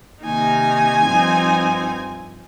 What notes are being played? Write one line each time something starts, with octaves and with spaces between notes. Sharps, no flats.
C3 D#3 A#3 D#4 G#5
G2 F3 C4 D#4